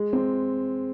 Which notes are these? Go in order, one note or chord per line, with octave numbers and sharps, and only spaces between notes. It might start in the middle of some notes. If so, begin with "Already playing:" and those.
Already playing: G#3
C4